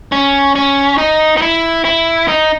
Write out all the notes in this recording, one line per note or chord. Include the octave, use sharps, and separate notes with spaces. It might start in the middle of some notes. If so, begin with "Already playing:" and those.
C#4
C#4
D#4
D#4
E4
E4
D#4